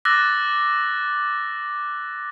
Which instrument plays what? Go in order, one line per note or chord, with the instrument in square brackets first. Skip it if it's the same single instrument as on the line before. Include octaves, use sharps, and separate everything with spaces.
[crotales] D6 E6 F#6 A6 A#6